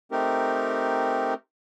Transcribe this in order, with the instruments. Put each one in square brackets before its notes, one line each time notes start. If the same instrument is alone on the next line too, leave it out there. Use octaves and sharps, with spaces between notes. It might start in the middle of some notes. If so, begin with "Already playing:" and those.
[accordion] A3 C4 D#4 G4 A#4